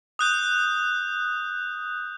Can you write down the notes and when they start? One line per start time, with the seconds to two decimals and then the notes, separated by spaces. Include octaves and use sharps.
0.19 D#6 F#6 G6